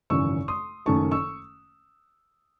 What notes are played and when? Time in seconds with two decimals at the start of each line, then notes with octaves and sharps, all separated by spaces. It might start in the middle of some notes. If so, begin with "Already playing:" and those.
0.10 G#1 F#2 C#3 E3 C#6 E6
0.48 C6 D#6
0.86 F#1 F#2 D#3 A3 A5 C#6
1.11 C#6 E6